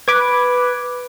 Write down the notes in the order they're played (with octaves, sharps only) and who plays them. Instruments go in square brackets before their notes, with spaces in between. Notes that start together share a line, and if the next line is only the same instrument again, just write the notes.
[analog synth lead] B4 [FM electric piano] D6 G#6